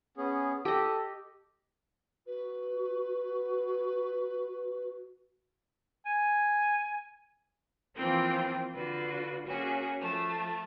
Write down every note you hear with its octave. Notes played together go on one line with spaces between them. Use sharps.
B3 C#4 G#4
G4 A4 D#5
F#4 B4
G#5
E3 F3 A#3 C4 F4 G5
D3 F4 F#4 B4
A#3 C#4 F#4 G#4
F3 A3